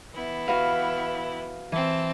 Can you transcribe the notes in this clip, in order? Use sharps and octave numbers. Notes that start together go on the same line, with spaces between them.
E3 B3 E4
F#4 B4 F5
E3 C4 A5